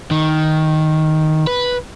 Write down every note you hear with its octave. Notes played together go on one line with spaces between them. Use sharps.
D#3
B4